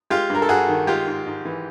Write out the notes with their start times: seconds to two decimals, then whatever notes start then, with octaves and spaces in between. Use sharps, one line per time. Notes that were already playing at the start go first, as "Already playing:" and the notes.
0.10 G#3 F4 G4
0.30 G2 A#4
0.42 A4
0.49 G2 F#4 G#4
0.68 D#3
0.87 G#3 F4 G4
1.07 G#2
1.26 G#2
1.45 E3